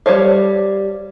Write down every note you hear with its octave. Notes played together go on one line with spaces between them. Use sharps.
G3 C5 C#5 F5